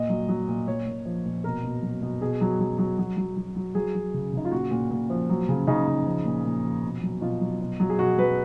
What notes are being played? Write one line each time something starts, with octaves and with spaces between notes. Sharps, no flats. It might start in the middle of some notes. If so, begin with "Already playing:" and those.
Already playing: A#2 D#5
F#3
F#3
A#2
A#2 C#5
A#2
F3
A#2
B2 A#4
B2
F#3
B2
B2 G#4
F#3
F#3
F#3
F#3
F#3
F#3
F#3
F#3 G#4
F#3
C#3
C#3 D#4
F4
A#2 F#4
A#2
A#2
F3
F#3
C#3
C#3 D#4
C#3
F3
A#2
A#2
F3
B2
F#3
B2 F4
F#3
B2
F#3
G#4
B2 F#4
F#3 B4